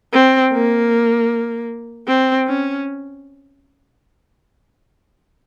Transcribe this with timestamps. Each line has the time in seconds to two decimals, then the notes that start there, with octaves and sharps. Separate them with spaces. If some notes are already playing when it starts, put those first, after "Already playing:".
0.13 C4
0.52 A#3
2.07 C4
2.47 C#4